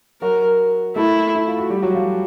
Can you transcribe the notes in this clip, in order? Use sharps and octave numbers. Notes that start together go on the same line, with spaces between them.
F#3 F#4 A#4
A3 E4 A4
E4
F4
F#4
G3 G4
F#3 F#4
F3 F4